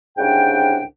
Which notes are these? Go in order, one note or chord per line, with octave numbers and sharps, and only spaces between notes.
C2 G#2 C#3 D4 F#5 G5